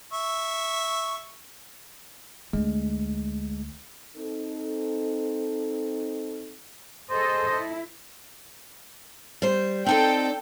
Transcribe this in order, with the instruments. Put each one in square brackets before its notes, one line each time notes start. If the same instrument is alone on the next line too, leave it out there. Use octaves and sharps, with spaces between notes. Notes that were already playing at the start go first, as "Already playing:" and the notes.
[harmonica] E5 C#6
[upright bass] D2 [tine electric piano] G#3
[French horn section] C4 D#4 A4
[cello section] G#4 A4 D#5 [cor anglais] C5
[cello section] E4
[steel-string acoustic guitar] G3 C5
[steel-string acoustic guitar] C4 D#4 D5 [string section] A4 G5